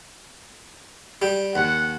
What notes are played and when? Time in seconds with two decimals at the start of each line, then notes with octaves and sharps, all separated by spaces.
1.22 G3 G4
1.55 D#2 F#5